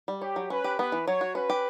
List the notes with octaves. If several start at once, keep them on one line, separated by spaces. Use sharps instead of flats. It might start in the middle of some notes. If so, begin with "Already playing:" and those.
G3
G4 C#5
F#3
C#4 B4
G4
B3 B4
E3
F#3 C#5
F#4
C#4 B4
G4